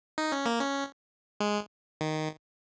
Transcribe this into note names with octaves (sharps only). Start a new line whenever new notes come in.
D#4
C#4
A#3
C#4
G#3
D#3